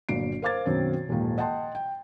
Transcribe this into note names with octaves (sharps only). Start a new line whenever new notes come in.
G1 A#2 F#3 C7 D7
A#4 C5 F5 D6 G#6 A6
F#2 B2 D#3 F#3 C4
D#1 D#2 G#2 D#3 F3
D#5 F#5 G5 A5 C6
G5